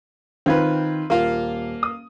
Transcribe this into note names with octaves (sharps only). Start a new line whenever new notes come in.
D#3 C4 F4 B4 G#6
D#1 A#3 F4
D#6